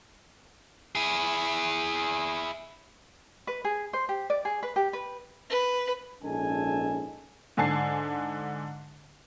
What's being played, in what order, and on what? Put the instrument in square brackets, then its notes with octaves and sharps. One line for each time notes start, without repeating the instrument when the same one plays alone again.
[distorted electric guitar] E4 G#4
[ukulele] B4
G#4
C5
G4
D5
G#4
B4
G4
B4
[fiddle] B4
[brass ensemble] A#1 G#2 C#4 A4 G#5 A5
[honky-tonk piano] G#2 D3 G#5 A5 C7